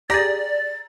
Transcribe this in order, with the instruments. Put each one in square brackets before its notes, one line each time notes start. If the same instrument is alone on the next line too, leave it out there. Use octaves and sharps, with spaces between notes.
[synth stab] G4 G#4 [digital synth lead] D5 [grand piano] A#5 A#6 [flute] A6